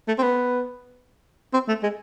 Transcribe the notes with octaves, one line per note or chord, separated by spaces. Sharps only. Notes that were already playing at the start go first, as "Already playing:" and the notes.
A3
C4
B3
C4
A3
G#3